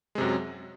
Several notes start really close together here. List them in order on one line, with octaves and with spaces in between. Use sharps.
G#3 C3 F#2 F#3